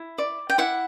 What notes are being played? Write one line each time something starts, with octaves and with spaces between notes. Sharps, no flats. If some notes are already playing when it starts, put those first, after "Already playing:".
Already playing: E4
D5
G5
E4 F#5